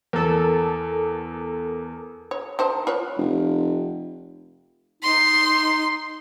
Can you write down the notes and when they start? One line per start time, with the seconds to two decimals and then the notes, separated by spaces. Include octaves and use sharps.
0.13 E2 A4 A#4
2.31 C#5
2.59 D#3 C5 A5
2.87 F4 B4 C#5
3.18 F1
5.02 D#4 C6